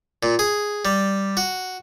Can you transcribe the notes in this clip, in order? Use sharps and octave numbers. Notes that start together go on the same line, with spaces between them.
A#2
G#4
G3
F#4